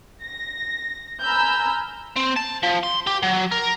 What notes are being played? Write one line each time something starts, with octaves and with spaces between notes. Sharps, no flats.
A#6
G#5 A#5 B5 E6 F6 G6
C4
A5
F3
C6
G4
F#3
A#4